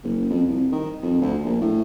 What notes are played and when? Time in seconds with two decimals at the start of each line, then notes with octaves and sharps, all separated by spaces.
0.04 F#1
0.30 F2
0.48 C2
0.72 D#3
1.03 F2
1.22 D2
1.45 A#1
1.61 A2